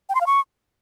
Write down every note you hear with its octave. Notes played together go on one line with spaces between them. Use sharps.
G5
C6
F5
C#6